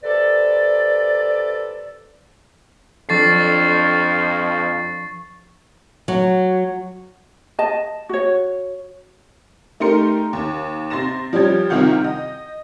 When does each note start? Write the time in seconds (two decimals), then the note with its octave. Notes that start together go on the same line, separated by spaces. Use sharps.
0.03 C3 A4 B4 D5
3.09 F2 F3 D4 A4 C#6 A6 C7
6.08 F#3
7.59 D#5 A5
8.09 F#4 C#5
9.80 A3 D#4 G4 A#4 C6 C#7
10.33 D#2
10.90 C3 C6 A6 A#6 E7
11.33 F3 G3 C#4 G4 G#6
11.69 C2 C3 D#3 F4 F#5 G6
12.04 D#5